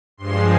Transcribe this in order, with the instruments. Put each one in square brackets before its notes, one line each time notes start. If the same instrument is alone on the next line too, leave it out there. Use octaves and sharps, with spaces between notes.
[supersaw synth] G2 F3 G#3 C6